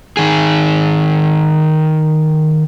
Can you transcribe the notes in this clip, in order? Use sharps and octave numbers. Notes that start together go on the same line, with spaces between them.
D#3 G#4